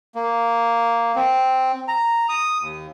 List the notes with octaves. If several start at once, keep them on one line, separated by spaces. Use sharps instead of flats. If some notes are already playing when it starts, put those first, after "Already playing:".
A#3
C4
A#5
D#6
D#2